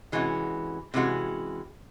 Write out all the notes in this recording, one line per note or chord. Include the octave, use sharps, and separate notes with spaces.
C3 E3 G#3 C#4 F#4
C3 E3 G#3 C#4 F#4